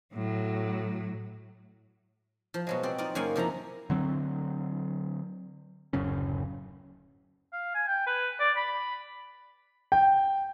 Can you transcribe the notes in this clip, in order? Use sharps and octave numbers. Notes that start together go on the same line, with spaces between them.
A2 F#3
F3
B2 F#3 G#3
C4 F#4 D5
D#4 F4 D5
F#2 C#3 A#3 F#5 G#5
C3 F3 E4 A#5
D3 F#3 C4
D1 F#2 C#3 C#4
F5
G#5
G5
B4
D5
B5
G5